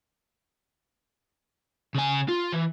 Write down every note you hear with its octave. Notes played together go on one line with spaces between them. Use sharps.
C#3 G#5
F4
E3